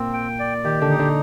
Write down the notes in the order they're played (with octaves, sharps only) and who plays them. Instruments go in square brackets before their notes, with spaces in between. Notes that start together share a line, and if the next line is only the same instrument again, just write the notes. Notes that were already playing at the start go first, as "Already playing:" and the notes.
Already playing: [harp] A#2 [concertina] C4
[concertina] G5
D5
[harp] D#3 [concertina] G4
[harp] D3
[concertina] D#4
[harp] D3